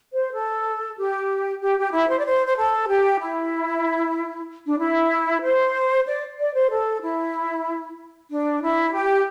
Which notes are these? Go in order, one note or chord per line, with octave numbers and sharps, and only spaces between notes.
C5
A4
G4
G4
G4
E4
C5
D5
C5
C5
A4
G4
E4
D4
E4
C5
D5
D5
C5
A4
E4
D4
E4
G4